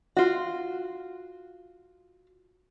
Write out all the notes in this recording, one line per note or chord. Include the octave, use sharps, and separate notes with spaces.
F4 F#4